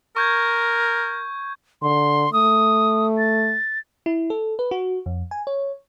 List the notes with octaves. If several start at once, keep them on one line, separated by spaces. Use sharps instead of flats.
A#4 C#6 G6 G#6
D3 C6
A3 D#6
A6
E4
A4
B4
F#4
F2
G#5
C#5